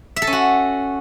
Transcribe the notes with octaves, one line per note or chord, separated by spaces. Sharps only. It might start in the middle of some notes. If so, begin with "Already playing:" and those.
E5
A4
C#4
F#4